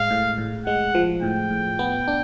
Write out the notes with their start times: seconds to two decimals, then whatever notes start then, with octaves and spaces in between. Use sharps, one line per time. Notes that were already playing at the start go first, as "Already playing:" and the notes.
Already playing: A2 G#3 F5
0.10 A2
0.38 A2
0.66 G#3 F#5
0.95 F3
1.23 A2 G5
1.50 A2
1.79 B3
2.08 D4